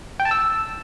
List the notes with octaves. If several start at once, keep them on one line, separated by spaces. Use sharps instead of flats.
G5
A5
E6